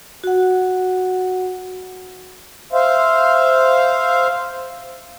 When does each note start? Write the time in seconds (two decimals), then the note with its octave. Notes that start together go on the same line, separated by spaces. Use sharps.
0.24 F#4 F#5
2.73 C5 E5 F5